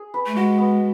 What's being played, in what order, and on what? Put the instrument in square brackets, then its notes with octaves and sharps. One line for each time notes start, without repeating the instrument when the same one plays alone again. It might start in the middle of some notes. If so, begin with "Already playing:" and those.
Already playing: [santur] G#4
B4
[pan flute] A3
[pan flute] G#3 [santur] F#4
[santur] B3